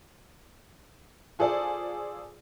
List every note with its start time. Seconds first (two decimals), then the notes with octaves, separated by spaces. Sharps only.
1.39 F4 G#4 A4 C5 D5